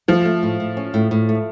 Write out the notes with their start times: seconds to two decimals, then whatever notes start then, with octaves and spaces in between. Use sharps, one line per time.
0.08 F3 A3
0.25 A3
0.43 A2
0.60 A2
0.77 C#4
0.94 A2
1.11 A2
1.29 A3